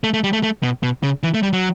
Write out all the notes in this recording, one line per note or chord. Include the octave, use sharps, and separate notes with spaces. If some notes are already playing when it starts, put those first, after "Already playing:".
A3
A3
G3
A3
A3
B2
B2
C#3
E3
A3
G3
F#3